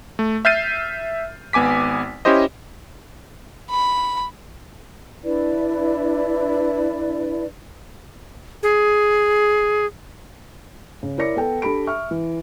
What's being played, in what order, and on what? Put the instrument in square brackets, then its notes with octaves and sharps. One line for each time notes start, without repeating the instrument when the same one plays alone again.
[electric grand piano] A3
E5 F6 G6 A6 C7 D#7
G#1 B3 G#5 D6 B6
C#4 E4 G4 C5 D#5
[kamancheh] B5
[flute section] D4 E4 B4 D5
[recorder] G#4
[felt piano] C#3
E4 A#4 C#5 D5 A#6 C#7
B3 A4 G5
D4 G4 A4 B5 D7
E5 C#6 F6
E3